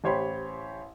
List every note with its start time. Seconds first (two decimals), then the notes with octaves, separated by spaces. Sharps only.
0.04 A1 G4 C5 C#5 B5 C6